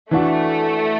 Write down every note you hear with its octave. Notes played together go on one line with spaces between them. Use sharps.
E3 A3 D4 F#4